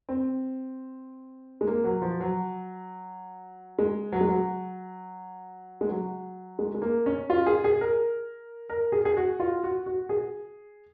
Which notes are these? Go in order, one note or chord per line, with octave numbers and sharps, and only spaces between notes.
C4
G#3
A#3
F#3
F3
F#3
G#3
F#3
G#3
F#3
G#3
F#3
G#3
G#3
A#3
C#4
F4
G#4
G#4
A#4
A#4
G#4
G#4
F#4
F4
F#4
F#4
G#4